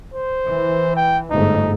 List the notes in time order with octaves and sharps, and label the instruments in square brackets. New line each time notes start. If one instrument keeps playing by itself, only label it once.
[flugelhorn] C5
[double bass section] E3
[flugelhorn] G5
[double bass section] G1 G#2 A3 [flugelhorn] D#4